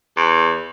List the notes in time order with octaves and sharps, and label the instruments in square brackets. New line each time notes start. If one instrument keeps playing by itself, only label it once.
[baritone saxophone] E2